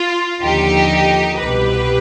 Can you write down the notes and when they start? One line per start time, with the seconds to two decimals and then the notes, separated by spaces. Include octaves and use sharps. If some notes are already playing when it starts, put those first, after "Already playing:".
Already playing: F4
0.42 D#2 D3 F3 D#4 G4
1.37 C2 B2 G4 B4